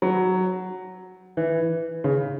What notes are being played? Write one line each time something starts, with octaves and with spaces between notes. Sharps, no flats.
F#3
E3
C#3